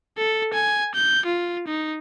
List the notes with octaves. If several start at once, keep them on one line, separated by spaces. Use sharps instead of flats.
A4
G#5
G6
F4
D#4